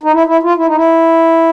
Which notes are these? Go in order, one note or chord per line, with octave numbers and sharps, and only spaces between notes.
D#4
E4
E4
F4
E4
D#4
E4